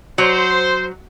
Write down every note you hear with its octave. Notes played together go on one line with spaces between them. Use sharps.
F#3 C5